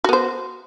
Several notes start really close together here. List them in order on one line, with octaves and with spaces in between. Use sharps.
F#4 B3 C5